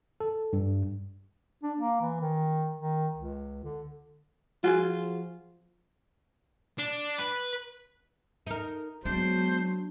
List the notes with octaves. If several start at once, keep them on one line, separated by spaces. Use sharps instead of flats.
A4
G2
D4
A#3
E3
D#3
D#3
C#2
D3
F3 F4 F#4 G#4
D4
B4
D#4 A#4
F#3 G#3 B3 D4 C5